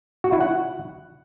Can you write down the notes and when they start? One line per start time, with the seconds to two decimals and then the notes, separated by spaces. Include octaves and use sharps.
0.24 F#4
0.32 E4
0.40 F#5